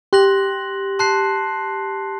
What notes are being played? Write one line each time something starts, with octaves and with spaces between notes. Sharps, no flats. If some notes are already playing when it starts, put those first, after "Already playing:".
G4 C6 F#6 A#6 F#7
A5 C6 F#6 C7